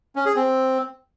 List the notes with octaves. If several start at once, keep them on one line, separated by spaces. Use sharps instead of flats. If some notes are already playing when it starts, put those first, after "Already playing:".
C#4
G#4
C4